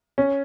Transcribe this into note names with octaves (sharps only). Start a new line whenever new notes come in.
C#4